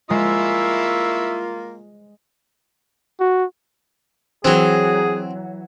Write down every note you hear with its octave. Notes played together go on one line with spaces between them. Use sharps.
G#3 A#3 E4 F4 C#6 E6
F#4
E3 F#3 C4 G#4